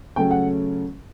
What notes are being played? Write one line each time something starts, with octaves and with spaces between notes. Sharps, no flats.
C#3 F#3 A3 C#4 G5
F#5